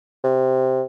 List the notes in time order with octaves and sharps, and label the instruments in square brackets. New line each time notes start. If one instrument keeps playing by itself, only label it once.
[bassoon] C3